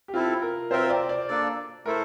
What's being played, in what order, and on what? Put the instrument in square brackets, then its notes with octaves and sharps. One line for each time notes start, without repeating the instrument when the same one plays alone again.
[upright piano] G4
[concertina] C4 E4 A4 [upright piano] F4
[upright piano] A#4
[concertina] C4 F4 A#4 E5 G5 [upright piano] C5
[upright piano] D5
D5
[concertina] A#3 D4 A4 D5
[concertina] A3 E4 A4 C5 [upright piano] A#4